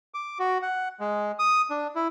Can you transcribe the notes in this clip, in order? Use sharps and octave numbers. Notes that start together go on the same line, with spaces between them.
D6
F#4
F#5
G#3
D#6
D4
E4